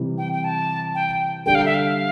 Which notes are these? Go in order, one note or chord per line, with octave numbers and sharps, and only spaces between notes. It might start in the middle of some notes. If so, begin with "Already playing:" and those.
Already playing: C3 E3 G3
G5
G5
A5
G5
D3 G3 D4 A4 G5
F5
E5
F5